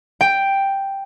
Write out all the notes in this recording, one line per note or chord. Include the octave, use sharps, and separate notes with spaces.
G5